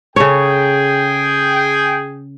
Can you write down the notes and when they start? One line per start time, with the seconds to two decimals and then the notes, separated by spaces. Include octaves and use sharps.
0.16 C#3 G#4 A4 C#5 G5